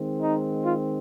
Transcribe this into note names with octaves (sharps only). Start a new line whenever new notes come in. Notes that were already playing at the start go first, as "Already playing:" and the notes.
Already playing: D#3 G#3 C4
D#4
F4